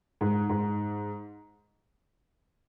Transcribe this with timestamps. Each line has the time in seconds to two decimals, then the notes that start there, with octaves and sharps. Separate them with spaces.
0.21 G#2
0.49 G#2